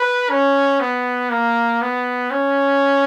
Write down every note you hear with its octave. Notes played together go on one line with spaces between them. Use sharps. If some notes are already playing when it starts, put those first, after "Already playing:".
Already playing: B4
C#4
B3
A#3
B3
C#4